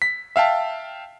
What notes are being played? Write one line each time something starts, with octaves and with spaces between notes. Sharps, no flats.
B6
E5 F5 G5 A5